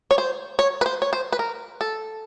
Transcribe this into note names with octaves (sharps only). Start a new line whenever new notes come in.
C#5
C5
C#5
B4
C5
C#5
C5
B4
A#4
A4